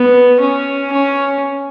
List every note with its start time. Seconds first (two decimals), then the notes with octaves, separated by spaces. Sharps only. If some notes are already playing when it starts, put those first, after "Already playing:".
Already playing: B3
0.40 C#4
0.92 C#4